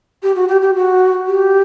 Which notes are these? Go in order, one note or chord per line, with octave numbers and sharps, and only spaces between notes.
G4
F#4
G4
G4
F#4
G4